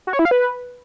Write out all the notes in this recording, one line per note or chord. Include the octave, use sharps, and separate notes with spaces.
F#4
C#5
E4
F5
B4